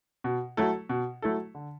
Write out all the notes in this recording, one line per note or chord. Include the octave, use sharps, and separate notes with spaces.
B2
F#3 A3 E4 A4
B2
F#3 A3 E4 A4
D3